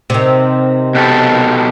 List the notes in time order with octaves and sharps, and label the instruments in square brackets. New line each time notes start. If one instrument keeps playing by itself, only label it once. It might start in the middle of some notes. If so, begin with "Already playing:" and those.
[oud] C3 D#3
[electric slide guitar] B2 G4 A4